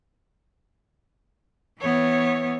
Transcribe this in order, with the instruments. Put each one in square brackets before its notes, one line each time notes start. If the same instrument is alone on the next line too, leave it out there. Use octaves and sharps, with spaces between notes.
[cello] E3 B3 [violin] C#5